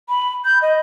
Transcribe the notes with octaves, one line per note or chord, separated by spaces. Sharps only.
B5
G6
D#5